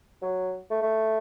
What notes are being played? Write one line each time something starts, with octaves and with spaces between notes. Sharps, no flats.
F#3
A3
A3